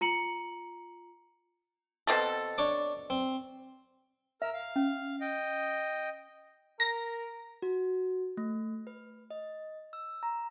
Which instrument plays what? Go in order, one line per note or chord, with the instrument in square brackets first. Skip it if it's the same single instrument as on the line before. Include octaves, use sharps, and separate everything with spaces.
[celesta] F4 A#5 C#7 F#7
[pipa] B2 C4 A4
[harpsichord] D4 C#5 D6
C4
[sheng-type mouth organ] A#4 E6 F6 [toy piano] E5
[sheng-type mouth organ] F5
[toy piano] C#4
[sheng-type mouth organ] D#5 G5
[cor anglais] A#4 [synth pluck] A#6
[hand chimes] F#4
A3
B4
D#5
E6
A#5